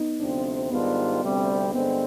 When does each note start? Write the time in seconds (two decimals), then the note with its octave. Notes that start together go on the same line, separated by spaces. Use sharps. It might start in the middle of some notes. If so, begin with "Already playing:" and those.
Already playing: B3 D#4
0.20 D2 C3 F3 C4 D4 F4
0.70 G#2 D#3 G3 B3 D4 F4
1.21 D2 C3 G3 C4
1.72 G2 D3 G#3 B3 C4